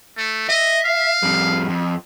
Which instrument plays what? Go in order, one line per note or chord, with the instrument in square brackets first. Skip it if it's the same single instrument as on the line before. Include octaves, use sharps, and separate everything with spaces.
[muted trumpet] A3
[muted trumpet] D#5 [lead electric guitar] E5
[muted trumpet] F5
[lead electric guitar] F2 G3
F2